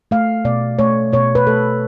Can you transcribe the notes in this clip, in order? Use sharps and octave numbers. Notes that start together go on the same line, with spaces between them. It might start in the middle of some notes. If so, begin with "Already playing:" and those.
A3 F5
B2 D5
A3 C#5
B2 C#5
B4
A3 A4